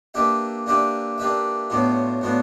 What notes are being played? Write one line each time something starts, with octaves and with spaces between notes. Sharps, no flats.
A#3 D4 G4 B4 E5
A#3 D4 G4 B4 E5
A#3 D4 G4 B4 E5
A2 F#3 B3 D4 F4
A2 F#3 B3 D4 F4